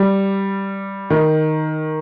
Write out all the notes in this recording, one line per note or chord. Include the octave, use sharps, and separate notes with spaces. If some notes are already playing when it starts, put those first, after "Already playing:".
Already playing: G3
D#3